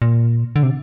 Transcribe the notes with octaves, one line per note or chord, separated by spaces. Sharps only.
A#2
D3
C3